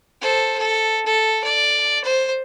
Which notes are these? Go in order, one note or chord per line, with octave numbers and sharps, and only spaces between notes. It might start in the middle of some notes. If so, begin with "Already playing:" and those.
A4 C5
A4
A4
D5
C5